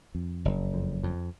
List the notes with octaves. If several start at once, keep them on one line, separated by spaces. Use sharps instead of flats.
F2
F#1
F2
F2